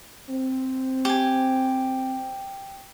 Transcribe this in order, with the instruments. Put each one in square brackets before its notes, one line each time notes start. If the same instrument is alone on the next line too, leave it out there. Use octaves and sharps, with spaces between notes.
[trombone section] C4
[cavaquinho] G4 G#5